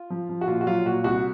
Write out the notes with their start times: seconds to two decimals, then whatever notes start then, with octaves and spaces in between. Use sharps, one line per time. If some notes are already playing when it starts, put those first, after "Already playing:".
Already playing: F4
0.10 F3
0.29 F3
0.41 F#4
0.48 A#2 F4
0.61 F#4
0.67 F#3 F4
0.86 A#2 F#4
1.04 C2 F#4